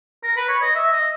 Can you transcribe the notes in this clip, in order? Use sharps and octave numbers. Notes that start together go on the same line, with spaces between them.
A#4
B4
C#5
D#5
E5
D#5